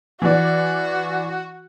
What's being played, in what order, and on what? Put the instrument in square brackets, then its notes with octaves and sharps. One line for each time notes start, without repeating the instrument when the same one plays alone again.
[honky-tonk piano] E3 D5 [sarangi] F#4